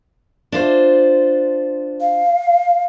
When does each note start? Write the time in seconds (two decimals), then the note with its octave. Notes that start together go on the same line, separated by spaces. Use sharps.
0.52 D4 F4 C5
2.01 F5